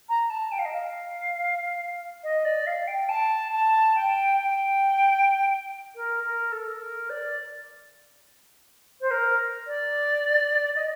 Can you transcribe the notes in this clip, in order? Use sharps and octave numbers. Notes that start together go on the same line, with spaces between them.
A#5
A5
G5
F5
D#5
F5
D#5
D5
F5
G5
A5
A5
G5
G5
A#4
A#4
A4
A#4
D5
C5
A#4
D5
D#5